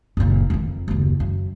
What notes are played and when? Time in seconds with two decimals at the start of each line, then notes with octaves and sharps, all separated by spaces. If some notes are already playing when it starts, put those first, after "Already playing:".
0.17 F#1 A#2
0.50 F2 D#3
0.88 F#1 D#2
1.20 F#2